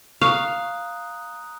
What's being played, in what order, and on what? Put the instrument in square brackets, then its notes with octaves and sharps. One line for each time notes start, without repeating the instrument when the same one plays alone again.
[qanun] F5 [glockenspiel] A#5 D#6 F#6 [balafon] C#6